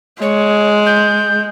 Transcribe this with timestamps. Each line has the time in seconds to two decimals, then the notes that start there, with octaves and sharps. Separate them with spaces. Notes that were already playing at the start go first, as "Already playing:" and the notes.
0.22 G#3 C#5
0.86 G6